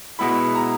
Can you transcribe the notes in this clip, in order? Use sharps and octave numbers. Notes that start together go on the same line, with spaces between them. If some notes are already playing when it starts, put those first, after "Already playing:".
B2 G#3 B3 E4 B5
A#5